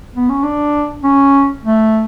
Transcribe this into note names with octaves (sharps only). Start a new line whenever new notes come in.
B3
C#4
D4
C#4
A3